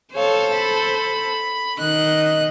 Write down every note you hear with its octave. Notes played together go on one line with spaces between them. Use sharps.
A4 C5 C#5 F5
B5
D#3 D#5 F#6